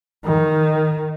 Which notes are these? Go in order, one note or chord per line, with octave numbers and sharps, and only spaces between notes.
D#3